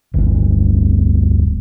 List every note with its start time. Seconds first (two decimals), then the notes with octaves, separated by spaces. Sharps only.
0.14 D1 G1